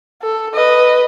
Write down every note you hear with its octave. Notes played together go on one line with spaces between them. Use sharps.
A4
B4 D#5